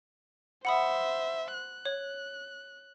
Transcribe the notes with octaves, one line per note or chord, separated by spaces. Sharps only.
C5 E5 F#5 B5 D#6
F#6
C#5